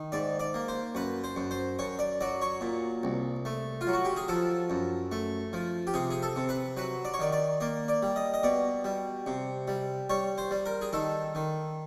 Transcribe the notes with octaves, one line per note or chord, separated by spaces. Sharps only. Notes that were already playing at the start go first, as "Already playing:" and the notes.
Already playing: D#3
G#2 D5
D5
A#3
C5
F#2 B4
C5
F#2
C5
F#2 C#5
D5
F#3 D5
C#5
A#2
C2
A3
F4
F#3
F#4
G4
G#4
F3 A4
F#2
A3
F3
G4
C3 G#4
G#4
A4
C3
B4
F#3 B4
D5
C#5
D#3 D5
D5
A#3 D5
D5
G3
D#5
D#5
B2 D5
G3
C3
G3
G3 C#5
C5
G3
A#4
G#4
D#3 A4
D#3